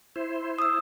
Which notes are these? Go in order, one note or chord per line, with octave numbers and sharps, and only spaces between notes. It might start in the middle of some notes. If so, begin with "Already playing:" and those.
E4 C5
D#6 E6